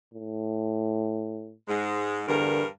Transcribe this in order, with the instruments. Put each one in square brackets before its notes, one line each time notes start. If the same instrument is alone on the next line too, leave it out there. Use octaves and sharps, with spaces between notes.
[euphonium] A2
[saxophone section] G#2 G#3
[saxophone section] E2 G2 A#4 [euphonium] D3